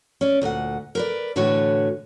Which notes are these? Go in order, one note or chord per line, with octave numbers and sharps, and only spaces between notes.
C#4 D5
D2 A#2 F#4 F#5
A#4 B4 D5
A2 D3 E3 F#4 B4 C#5